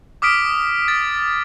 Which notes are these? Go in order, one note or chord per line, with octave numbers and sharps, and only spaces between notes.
D6 D#6 F6 B6 D7
A6